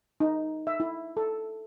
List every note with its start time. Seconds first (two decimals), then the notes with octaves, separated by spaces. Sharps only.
0.20 D#4
0.67 E5
0.80 E4
1.17 A4